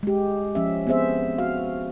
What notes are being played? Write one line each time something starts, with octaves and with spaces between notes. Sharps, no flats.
G#3 G4
F3 C#4 E5
B3 C4 G#4 C5 E5
F#4 F5